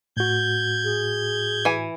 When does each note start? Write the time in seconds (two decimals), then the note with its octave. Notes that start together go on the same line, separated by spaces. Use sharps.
0.17 A2 F#4 G6 G#6
0.84 G#4
1.65 E3 G#5